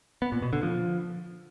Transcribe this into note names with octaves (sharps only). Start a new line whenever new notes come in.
B3
A#2
B2
D3
F3